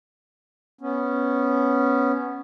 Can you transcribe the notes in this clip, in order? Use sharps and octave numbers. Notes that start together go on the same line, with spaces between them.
B3 C#4